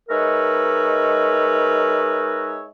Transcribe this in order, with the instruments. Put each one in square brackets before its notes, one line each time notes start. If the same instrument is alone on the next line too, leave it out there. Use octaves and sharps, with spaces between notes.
[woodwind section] G#3 D#4 A#4 B4 C#5 E5